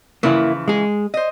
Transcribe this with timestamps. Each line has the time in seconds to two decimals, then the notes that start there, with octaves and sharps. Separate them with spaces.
0.23 C#3 E3 F3 A#3 E4
0.68 G#3 G#4
1.14 C5 D#5